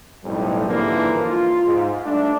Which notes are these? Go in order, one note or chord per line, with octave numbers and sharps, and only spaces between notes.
B1 F2 A2 G3
G#2 D3 E3 F3 A#3
F4
G#2
G3 A3 D4